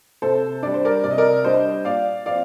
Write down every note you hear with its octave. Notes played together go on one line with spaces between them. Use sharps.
C3 A4 C5
G3 D4 D5
C5
A#4 D5
C3 D5
D#5
A#4 D5
G3 D4 C5 D#5
A#2 D5 F5
F3 C4 D5 F5